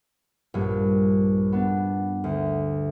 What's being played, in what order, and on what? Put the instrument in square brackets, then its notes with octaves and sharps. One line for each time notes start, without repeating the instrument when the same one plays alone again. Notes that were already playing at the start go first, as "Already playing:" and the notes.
[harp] A#1 G2
B3 D4
D2